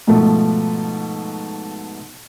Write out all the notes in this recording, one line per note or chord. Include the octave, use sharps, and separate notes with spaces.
G#2 B2 F3 A3